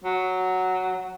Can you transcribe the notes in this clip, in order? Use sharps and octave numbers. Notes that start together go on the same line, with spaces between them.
F#3